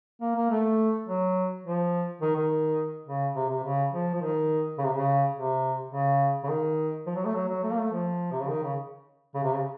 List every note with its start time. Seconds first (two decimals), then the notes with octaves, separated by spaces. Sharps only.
0.21 A#3
0.36 A#3
0.50 A3
1.08 F#3
1.64 F3
2.21 D#3
2.36 D#3
3.06 C#3
3.36 C3
3.49 C3
3.64 C#3
3.92 F3
4.14 F3
4.21 D#3
4.78 C#3
4.85 C3
4.93 C#3
5.34 C3
5.91 C#3
6.44 C#3
6.49 D#3
7.07 F3
7.15 F#3
7.25 A3
7.35 F#3
7.49 F#3
7.63 A3
7.70 A#3
7.78 A3
7.92 F3
8.32 C3
8.41 C#3
8.49 D#3
8.63 C#3
9.35 C#3
9.44 C3
9.53 C#3